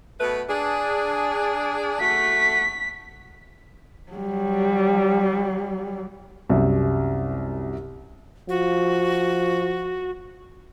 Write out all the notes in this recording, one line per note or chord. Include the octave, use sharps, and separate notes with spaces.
B2 A3 B4
D4 G#4
A3 F#4 B6
F#3 G3
C2 F#2
F3 F#4